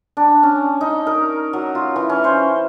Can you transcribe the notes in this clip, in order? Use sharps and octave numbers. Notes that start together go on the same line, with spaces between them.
D4
C#4
D#4
A#4
F#3
F4
E3
C#4
C5